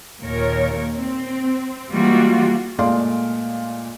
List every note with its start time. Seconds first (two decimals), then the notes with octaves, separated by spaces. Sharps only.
0.21 D#2 A#2 A#4 C#5
0.95 C4
1.90 E3 G3 G#3 A#3 F4 F#4
2.79 A#2 G#3 A3 D5 F5 C6